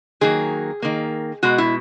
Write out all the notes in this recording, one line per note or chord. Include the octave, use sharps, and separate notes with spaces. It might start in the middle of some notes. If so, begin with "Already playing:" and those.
D#3 F#3 A#3 G#4
D#3 A#3
B2 G#3 F#4
E4